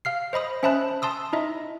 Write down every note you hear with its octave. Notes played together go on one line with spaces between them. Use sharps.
F5 F6 C7
C5 D#5 B5 D#6
C#4 C5 E5 A5 B5 F#6
A5 C6 D#6 E6
D#4 E4 D#5 E5